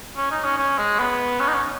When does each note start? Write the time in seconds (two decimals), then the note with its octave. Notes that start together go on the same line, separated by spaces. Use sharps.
0.17 C#4
0.31 D#4
0.44 C#4
0.58 C#4
0.78 G#3
0.99 B3
1.40 C#4
1.48 D#4
1.54 C#4